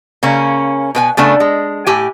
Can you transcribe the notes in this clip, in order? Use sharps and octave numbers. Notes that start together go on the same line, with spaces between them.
C#3 A#3 C#4
B2 B4 G#5
C#3 A3 B3 D4
G#3
A2 G4 G#5